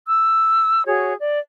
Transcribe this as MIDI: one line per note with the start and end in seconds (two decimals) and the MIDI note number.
0.08 0.85 88
0.86 1.14 66
0.86 1.14 68
0.86 1.14 73
1.20 1.40 74